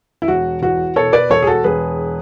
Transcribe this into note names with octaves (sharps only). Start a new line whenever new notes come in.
E4
E1 F#4
E2 F#4
B2 A4 C#5
B4 D5
E1 A4 C#5
G#4
F#4 A4
E1 G#4 B4